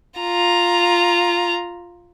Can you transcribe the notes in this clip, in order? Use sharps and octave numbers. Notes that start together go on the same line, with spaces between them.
F4 A#5